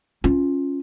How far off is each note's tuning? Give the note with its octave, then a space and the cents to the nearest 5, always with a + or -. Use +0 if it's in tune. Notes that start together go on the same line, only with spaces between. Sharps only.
C#4 -5 F4 +0